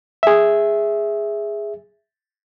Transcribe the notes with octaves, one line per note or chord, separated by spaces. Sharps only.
G#4 E5